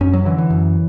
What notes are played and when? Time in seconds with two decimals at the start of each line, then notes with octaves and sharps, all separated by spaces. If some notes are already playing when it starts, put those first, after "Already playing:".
0.01 F#2 C#4
0.13 F#3
0.25 D3 E3
0.38 E3
0.50 F#2